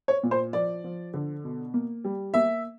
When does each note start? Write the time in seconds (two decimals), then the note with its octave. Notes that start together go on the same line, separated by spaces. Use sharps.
0.08 C#5
0.23 A#2
0.31 C5
0.53 F3 D5
0.84 F3
1.14 D3
1.44 B2
1.74 A#3
2.04 G3
2.34 A#3 E5